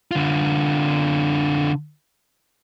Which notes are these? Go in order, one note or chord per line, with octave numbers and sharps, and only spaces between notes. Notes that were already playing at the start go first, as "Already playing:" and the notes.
D3 F4